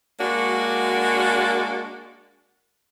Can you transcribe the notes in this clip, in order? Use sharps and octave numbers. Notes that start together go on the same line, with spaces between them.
G#3 A#3 D4 F#4